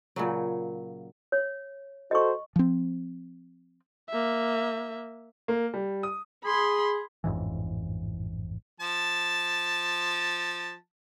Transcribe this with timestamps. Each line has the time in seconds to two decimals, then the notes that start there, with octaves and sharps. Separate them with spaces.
0.16 A#2 C#3 F#3
1.32 C#5
2.11 F#4 A4 C5 D#5 C#6
2.56 F3 C4
4.09 A#3 E5
5.48 A#3
5.74 G3
6.03 D#6
6.45 G#4 B5 C6
7.24 A1 F2 G#2 E3
8.80 F3 A5